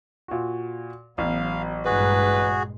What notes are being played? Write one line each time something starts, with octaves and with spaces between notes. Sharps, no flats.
A#2 F#4
A1 F#3 B3 F5
G2 A#2 G#3 F#4 G#4 B4